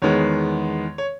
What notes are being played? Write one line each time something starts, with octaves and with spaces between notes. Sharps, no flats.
E2 D#3 G#3 B3 C#5
C#5